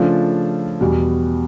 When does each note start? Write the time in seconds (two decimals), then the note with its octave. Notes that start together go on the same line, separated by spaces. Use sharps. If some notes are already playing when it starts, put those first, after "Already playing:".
Already playing: C#3 F3 A3 D4 F4
0.80 E2 B2 G3